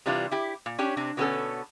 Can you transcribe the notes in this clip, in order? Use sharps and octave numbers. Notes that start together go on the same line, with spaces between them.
C3 E3 G3 D4 F4
E4 G4
A#2
C#4 D4 G4 C#5
C3 C4 D4
B2 D3 G3 B3 C#4 A4